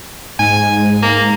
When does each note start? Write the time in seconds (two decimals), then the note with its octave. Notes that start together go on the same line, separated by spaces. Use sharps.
0.39 G#2 G#5
1.02 A#3